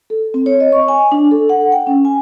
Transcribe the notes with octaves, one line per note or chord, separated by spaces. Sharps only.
A4
C4
C#5
D#5
C#6
G#5
D4
A4
F#5
G5
C#4
G#5